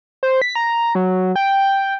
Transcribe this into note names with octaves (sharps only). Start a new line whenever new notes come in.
C5
B6
A#5
F#3
G5